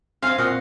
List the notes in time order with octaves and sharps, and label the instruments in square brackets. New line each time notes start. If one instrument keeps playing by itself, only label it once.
[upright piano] C4 [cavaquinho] F5 G#5
[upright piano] A#2 [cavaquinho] D#5 F#5